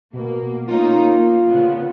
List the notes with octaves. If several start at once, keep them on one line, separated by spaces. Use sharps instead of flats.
B2 A#3
A#3 C#4 D#4 F4
A#3
A#2 C#3 B3